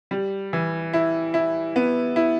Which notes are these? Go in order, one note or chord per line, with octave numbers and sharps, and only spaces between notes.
G3
E3
E4
E4
B3
E4